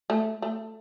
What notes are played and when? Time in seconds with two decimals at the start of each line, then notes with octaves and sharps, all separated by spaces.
0.10 A3
0.42 A3